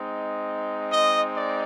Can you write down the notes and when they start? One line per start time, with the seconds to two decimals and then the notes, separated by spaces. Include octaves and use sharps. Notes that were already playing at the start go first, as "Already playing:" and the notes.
Already playing: G#3 C4 D#4
0.89 D#5
1.34 D5